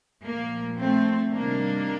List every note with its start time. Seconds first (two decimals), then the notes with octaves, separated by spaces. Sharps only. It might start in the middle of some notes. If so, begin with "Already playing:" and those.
0.23 A#2 F3 A#3
0.77 A3 C4
1.32 C3 D#3 G3 A#3 D4